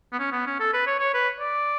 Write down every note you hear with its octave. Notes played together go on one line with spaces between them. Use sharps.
B3
C#4
B3
C#4
A4
B4
C#5
C#5
B4
D5